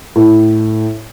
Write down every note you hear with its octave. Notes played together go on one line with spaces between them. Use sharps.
A2